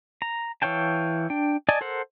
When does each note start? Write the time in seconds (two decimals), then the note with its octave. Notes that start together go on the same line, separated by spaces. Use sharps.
0.22 A#5
0.62 E3 C#5 F5 G5 A5
1.30 D4 G5
1.69 D5 D#5 G#5 A5
1.81 A4 A#4 C5 F#5